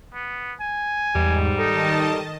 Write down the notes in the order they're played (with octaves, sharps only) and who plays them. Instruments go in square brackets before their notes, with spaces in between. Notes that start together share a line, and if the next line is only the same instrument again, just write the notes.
[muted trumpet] B3
G#5
[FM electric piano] E2 [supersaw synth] G#2 [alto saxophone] G3
[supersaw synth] D#3 D#5 A5 [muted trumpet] D#4 [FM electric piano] A4